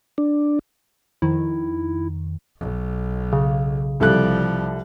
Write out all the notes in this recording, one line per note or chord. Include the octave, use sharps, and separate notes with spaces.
D4
F2 D#3 E4
B1
C#3
C2 F3 G3 A4 F#6